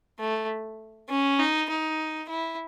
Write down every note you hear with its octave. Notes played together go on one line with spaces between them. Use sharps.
A3
C#4
D#4
D#4
E4